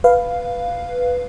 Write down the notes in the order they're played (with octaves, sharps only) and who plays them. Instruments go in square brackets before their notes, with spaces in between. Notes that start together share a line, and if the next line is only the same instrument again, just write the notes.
[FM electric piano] B4 F5